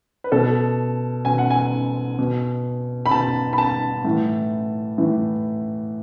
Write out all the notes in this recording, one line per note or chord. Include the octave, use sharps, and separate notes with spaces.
B4
B2 A4
B2 G#5
F#5
G#5
B2
B5
B2 A5
B5
A5
A2 E3
A2 E3